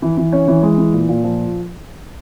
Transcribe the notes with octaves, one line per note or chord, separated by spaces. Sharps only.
E3
E3
C#4
E3
G#3
E3
A#2
A#2
F3